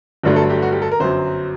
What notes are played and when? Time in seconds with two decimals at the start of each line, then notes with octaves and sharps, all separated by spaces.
0.24 G1 G2 D3 F#3 A3
0.36 A4
0.50 G4
0.62 F#4
0.72 G4
0.82 A4
0.91 A#4
1.00 G1 F#2 F#3 C5